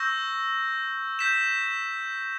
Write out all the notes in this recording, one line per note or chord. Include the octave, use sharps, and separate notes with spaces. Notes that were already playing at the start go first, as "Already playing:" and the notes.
Already playing: C#6 E6 G6 A#6
G6 B6 E7